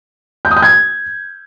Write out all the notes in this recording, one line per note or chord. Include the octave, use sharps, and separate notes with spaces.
G6
D#6
G6
G#6